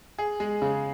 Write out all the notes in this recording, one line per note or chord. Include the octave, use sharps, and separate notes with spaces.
G#4
G#3
C#3